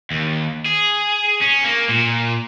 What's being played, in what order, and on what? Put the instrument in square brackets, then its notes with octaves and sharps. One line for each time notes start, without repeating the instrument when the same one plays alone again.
[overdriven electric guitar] D#2
G#4
C#4
A#3
A#2